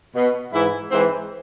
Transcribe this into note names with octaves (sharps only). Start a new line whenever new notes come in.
B2
G#2 E3 E4
G#2 E3 C4